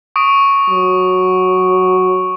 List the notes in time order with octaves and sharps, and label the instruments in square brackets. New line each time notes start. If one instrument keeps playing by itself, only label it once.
[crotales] C#6 D#6 D7
[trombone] F#3